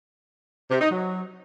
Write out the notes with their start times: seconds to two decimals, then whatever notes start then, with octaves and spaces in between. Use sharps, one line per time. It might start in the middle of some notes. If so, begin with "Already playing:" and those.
0.71 C3
0.81 D#4
0.91 F#3